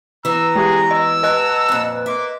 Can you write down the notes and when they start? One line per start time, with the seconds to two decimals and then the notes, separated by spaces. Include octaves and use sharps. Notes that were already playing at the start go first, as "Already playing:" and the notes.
0.25 E3 B3 A#5 E6
0.56 G#3 G4 G#4
0.91 D#5 E6
1.23 B4 D#5 F#5 A5 A#5 F#6
1.69 F2 A#2
2.06 A#3 E5 C6 D6